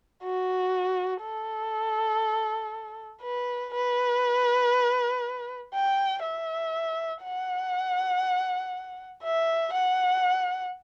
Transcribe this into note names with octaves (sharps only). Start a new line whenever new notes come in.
F#4
A4
B4
B4
G5
E5
F#5
E5
F#5